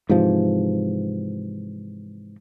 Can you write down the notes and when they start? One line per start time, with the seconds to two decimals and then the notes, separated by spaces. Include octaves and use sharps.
0.09 G#2 C3 E3 F3